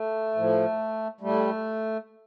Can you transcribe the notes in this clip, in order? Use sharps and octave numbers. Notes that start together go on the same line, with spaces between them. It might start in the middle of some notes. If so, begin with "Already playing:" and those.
Already playing: A3
A2 F3
A2 G3 A3